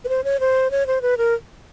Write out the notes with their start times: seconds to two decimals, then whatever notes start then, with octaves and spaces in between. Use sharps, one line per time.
0.05 B4
0.09 C5
0.24 C#5
0.40 C5
0.71 C#5
0.87 C5
1.02 B4
1.18 A#4